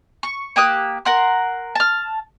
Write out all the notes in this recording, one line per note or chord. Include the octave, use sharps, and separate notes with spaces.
C#6
A#3 G4 D#6 F#6
A#4 F#5 C6
A5 F6